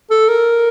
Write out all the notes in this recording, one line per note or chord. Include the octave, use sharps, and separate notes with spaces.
A4
A#4